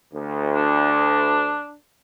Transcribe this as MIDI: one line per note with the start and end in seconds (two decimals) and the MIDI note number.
0.14 1.58 38
0.55 1.73 62